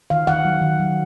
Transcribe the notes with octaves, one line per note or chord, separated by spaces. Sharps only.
D#3 F5
D#3 F#5
F#3
D#3
F#3